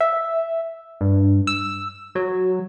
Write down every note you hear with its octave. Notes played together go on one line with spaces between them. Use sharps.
E5
G2
E6
F#3